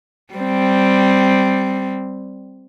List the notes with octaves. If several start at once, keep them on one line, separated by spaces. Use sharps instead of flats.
G3 C4